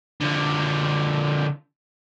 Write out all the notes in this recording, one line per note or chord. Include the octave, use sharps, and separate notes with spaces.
D3 F3